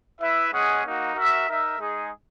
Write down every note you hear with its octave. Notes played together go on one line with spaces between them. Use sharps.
E4 B4 E5
G#3 C#4 G#4 D#5 F#5
A#3 D#4 F#4
F#4 A#4 E5
D#4 A#4 E5
G#3 D#4 G#4